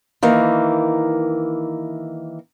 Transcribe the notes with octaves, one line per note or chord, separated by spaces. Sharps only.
D#3 E3 A#3